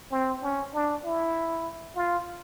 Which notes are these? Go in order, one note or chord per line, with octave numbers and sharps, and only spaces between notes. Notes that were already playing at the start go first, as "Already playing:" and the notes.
C4
C#4
D4
E4
F4